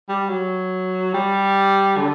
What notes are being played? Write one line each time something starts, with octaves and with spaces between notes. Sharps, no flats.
G3
F#3
G3
D3